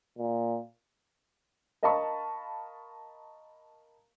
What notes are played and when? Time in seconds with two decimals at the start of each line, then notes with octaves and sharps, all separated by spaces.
0.18 A#2
1.83 A#4 D#5 F5 A5 B5 C#6